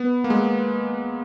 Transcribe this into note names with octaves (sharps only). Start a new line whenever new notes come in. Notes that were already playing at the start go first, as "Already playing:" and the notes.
Already playing: B3
A#3
G#3